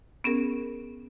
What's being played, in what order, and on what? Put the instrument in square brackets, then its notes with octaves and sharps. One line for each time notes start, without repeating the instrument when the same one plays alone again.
[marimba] B3 C#4 G#4 A#4